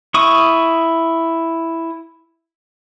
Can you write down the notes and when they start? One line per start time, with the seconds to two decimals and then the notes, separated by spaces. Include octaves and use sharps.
0.14 E4 C#6 D#6